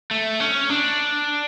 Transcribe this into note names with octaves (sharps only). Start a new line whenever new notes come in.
A3
C#4
D4